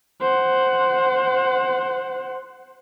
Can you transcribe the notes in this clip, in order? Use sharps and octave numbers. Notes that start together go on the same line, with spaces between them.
C5 F#5